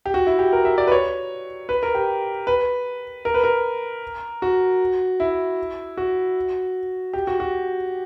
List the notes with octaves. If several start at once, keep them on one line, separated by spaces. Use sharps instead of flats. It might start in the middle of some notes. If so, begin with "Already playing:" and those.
G4
F#4
E4
G4
A#4
E5
D5
B4
C#5
B4
A#4
G4
B4
A#4
B4
A#4
F#4
E4
F#4
G4
F#4
F#4